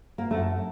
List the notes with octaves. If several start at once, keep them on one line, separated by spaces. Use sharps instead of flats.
A#3
F#2 A3